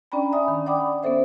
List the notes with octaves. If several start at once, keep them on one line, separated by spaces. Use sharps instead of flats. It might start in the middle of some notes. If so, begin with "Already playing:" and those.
C#4 D4 D5 G5 A#5 B5
D5 E5 G#5 B5 D#6
D#3
D5 F#5 G5 B5 D6 D#6
B3 C#4 A4 C5 E5